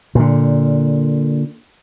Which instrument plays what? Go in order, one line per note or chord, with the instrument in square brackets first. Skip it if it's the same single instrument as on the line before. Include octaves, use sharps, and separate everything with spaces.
[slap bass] A#2 D3